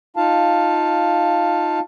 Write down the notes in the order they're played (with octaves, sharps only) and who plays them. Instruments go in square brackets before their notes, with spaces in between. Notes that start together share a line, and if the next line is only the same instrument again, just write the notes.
[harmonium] D#4 F4 F5 A5